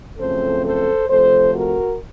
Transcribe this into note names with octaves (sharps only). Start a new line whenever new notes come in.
F#2 C#3 F3 A3 C4 A4 C5
A4 C5
C3 F3 A3 A4 C5
F#4 A#4